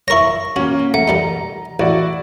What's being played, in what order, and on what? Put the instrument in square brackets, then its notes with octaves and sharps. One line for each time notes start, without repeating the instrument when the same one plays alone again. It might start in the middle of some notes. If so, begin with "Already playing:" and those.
[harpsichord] E4 A#4 C#5 [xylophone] C#6 A#6
[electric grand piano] A#3 C#4 [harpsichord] F#4
[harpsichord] A3 [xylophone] F#5 [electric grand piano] A#5
[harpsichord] D#3 G3 D#4
[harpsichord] A1 [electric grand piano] E4 F#4 D5